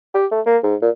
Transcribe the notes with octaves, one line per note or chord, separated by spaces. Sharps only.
G4
A3
A#3
G#2
A#2